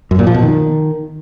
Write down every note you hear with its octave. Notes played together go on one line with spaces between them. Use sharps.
F#2
A#2
F3
B2
D#3